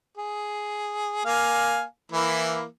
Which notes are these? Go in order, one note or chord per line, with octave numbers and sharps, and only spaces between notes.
G#4
A#3 F5 G#5
E3 A#3 E4